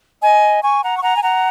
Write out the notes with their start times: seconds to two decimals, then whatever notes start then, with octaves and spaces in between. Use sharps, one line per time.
0.21 D#5 G#5
0.62 G#5 C#6
0.82 F#5 A#5
0.96 C#6
1.02 F#5 A#5
1.15 G#5
1.22 F#5 A#5